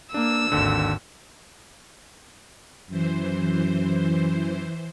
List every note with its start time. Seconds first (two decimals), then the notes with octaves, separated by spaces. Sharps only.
0.14 A#3 D4 E6
0.52 G#1 D#2 D3
2.90 F#2 E3 C5